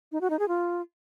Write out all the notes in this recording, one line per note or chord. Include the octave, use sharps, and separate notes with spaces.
D#4
F#4
D#4
G#4
F4